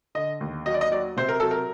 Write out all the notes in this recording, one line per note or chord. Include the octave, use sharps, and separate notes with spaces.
D3 D#5
D#2
F#3 D#5
D5
D#5
F#3 D5
C3 C5
A#4
F#3 A4
A#4